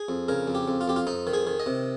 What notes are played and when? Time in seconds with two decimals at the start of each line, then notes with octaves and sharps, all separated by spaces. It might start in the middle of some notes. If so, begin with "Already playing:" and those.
Already playing: G#4
0.09 F2
0.28 C#3 A#4
0.48 F2
0.55 G4
0.68 F2
0.81 F4
0.88 F2 G4
0.96 F4
1.07 F2 D#4
1.27 D#3
1.33 G#4
1.47 D#3
1.60 D#5
1.66 C3